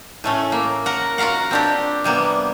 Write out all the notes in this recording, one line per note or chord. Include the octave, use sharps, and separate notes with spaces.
A2 A3 C#4
A#3
A#4 F#5
F4 F#4 A#4 F5 F#5
C4 D4 G4
C3 G3 A#3 B3